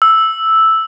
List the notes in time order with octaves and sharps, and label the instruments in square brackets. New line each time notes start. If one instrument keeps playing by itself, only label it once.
[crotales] E6